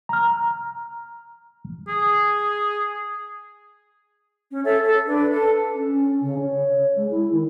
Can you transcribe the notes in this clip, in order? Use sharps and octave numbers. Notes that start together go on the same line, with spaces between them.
A#5 F6
G#4
C#4
A4 C#5 E5
A4
D4 B4
A4
C#4
C#3
C#5
G#3
E4
D#3